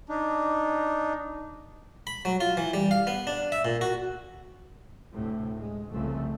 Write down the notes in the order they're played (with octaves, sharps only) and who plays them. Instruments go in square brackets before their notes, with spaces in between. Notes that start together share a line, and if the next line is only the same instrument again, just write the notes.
[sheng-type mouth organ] D4 D#4
[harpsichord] B5
F#3
F4
E3
G3
F5
B3
D4
E5
A#2
F#4
[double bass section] D2 A2 C3
G#3
F1 C2 F2 C#3 A3